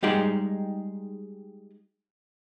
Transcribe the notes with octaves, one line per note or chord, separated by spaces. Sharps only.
G3 G#3 D#4 G4 G#4 G5